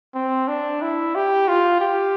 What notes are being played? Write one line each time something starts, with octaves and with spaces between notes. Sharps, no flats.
C4
D4
E4
G4
F4
G4